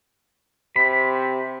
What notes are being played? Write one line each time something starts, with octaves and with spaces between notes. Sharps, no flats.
C3 B5